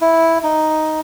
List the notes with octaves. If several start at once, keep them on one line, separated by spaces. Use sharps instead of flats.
E4
D#4